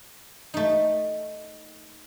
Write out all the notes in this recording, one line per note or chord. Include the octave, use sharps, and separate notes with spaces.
A3 D#4